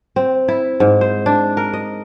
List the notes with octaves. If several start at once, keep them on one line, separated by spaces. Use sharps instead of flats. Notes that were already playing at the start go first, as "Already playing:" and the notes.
C4
E4
G#2
C5
D4
A#4
D#5